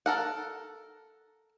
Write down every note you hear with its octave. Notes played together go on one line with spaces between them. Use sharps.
A4 A#4 F#5